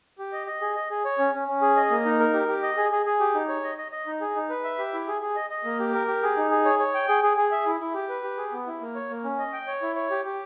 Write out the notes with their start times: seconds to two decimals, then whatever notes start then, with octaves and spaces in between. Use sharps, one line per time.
0.18 G4
0.33 D#5
0.47 D#5
0.61 G#4
0.75 D#5
0.90 G#4
1.05 C#5
1.19 C#4
1.33 C#4
1.48 C#4
1.62 G#4
1.76 D#5
1.91 A#3
2.05 D#4
2.20 A#4
2.33 G4
2.48 G4
2.63 D#5
2.77 G#4
2.92 G#4
3.06 G#4
3.20 G4
3.35 D#4
3.48 C#5
3.63 D#5
3.78 D#5
3.92 D#5
4.07 D#4
4.21 G#4
4.35 D#4
4.50 B4
4.64 E5
4.78 G4
4.93 E4
5.07 G#4
5.22 G#4
5.36 D#5
5.50 D#5
5.65 A#3
5.79 G4
5.94 A#4
6.08 G4
6.23 G#4
6.37 D#4
6.51 G#4
6.65 C#5
6.79 C#5
6.94 G5
7.09 G#4
7.23 G#4
7.37 G#4
7.52 E5
7.66 E4
7.80 E4
7.94 G4
8.09 B4
8.23 G4
8.37 G#4
8.53 B3
8.67 E4
8.81 A#3
8.95 C#5
9.10 A#3
9.24 C#4
9.39 D#5
9.53 G5
9.67 C#5
9.82 E4
9.96 C#5
10.10 G4
10.25 G4